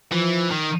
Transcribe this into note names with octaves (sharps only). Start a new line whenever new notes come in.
E3 F3
D#3